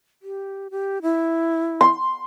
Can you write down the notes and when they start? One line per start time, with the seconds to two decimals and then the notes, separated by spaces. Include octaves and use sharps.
0.22 G4
0.71 G4
1.02 E4
1.81 C6